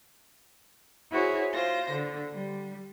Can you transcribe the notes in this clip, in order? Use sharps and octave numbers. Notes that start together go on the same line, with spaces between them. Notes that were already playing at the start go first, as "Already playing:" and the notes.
E4 F#4 G#4 C5 C#5
F4 C5 A#6
D3
G3